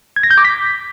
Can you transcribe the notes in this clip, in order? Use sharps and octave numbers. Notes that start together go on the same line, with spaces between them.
G#6
A#6
G6
D6
B6